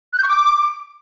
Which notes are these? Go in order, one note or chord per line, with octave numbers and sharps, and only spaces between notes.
F#6
G6
C#6
D6